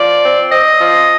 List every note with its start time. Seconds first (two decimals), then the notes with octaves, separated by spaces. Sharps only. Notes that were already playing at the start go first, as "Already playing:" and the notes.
Already playing: F3 D5
0.22 C4
0.50 C4 D#5
0.80 F3